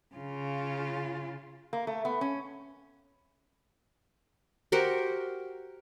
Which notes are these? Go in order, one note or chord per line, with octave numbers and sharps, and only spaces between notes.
C#3 F4
A#3
A3
B3
C#4
F#4 G4 A#4 C5